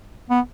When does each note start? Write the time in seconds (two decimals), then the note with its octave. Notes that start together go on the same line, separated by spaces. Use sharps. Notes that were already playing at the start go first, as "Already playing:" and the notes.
0.30 B3